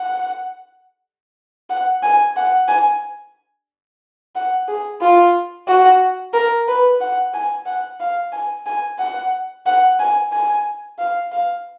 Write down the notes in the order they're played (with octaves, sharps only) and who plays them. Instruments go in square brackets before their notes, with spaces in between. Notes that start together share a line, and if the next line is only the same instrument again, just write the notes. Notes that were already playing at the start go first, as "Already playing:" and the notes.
Already playing: [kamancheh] F#5
F#5
G#5
F#5
G#5
F#5
G#4
F4
F#4
A#4
B4
F#5
G#5
F#5
F5
G#5
G#5
F#5
F#5
G#5
G#5
F5
F5